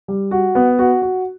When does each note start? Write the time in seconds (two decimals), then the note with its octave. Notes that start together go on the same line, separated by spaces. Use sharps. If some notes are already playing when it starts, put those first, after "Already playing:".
0.08 G3
0.31 F#4
0.55 B3
0.79 F#4
1.02 F#4